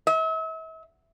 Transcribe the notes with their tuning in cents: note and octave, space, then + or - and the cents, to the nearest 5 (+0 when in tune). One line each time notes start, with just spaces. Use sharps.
E5 -40